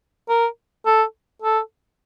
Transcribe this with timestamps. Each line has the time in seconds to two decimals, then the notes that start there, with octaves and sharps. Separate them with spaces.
0.29 A#4
0.86 A4
1.42 A4